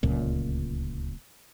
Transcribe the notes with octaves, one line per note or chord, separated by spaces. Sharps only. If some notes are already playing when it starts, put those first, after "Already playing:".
D1 C#2 A#2